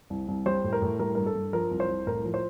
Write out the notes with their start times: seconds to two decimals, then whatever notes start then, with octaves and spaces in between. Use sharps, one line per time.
0.10 C2
0.28 C2
0.46 G3 C5
0.64 A2
0.73 A#4
0.82 A2
0.99 G3 A#4
1.15 G2 A#4
1.26 A4
1.35 G2
1.53 F3 A#4
1.71 C2
1.80 C5
1.89 C2
2.07 A2 A#4
2.25 F3
2.34 C5